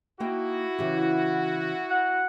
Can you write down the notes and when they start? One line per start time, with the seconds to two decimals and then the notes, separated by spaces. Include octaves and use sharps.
0.20 A#3 D#4 E4 F#4 G5
0.79 C#3 E3 G4
1.90 F#5